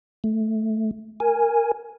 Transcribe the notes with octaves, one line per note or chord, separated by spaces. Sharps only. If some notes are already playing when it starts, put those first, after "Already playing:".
A3
A#4 G#5